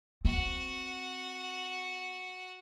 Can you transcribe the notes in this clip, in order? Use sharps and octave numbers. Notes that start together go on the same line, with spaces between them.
C4 F#4 F#5